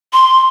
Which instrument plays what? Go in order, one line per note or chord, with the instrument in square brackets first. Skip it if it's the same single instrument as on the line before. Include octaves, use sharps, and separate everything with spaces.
[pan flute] C6